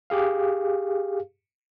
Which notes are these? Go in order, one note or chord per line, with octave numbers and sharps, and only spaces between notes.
G4 G#4 F5